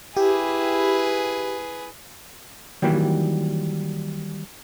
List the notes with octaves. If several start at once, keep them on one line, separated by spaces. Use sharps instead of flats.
E4 G4 G#4 B4
D#3 E3 F#3 G3 A#3